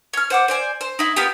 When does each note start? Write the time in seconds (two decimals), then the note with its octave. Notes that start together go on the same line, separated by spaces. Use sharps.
0.13 C#5 F6
0.30 C5 F#5 D6
0.48 C5 D5 G#5
0.81 C5
0.99 D#4 E4
1.16 A#3 B3 F4 G4